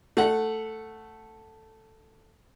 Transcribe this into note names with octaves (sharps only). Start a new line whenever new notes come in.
A3 F#5